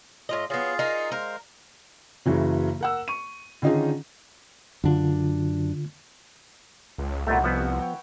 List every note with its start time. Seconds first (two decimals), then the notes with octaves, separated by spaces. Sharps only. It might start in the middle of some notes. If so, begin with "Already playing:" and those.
0.29 A2 F4 D#5
0.50 F#3 B3 F4 G#4 F5
0.79 D#4 A#4
1.12 G#3 A#4 C5 F5
2.26 F#1 C#3 E3 F#3
2.81 A#4 F#5 E6
3.08 C#6 D#7
3.62 D3 D#3 C#4 D#4 F4 G#4
4.84 F#2 D3 D4 F4
6.98 C#2
7.27 C2 A#2 A3 B3 D#4 F#4
7.44 F3 B3 E5 F#5 G#5
7.80 C#5 G5